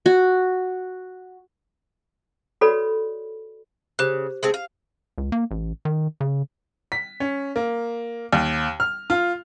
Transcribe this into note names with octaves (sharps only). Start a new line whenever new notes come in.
F#4
F#4 A4 B4 C#5 D5 B5
C#3 G4 C5 F#6
G#3 A3 C4
F5
C#2
A#3
A1
D#3
C#3
B6
C#4
A#3
D#2
F6
F4